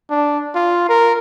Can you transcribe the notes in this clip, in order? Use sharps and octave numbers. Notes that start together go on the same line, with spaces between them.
D4
F4
A#4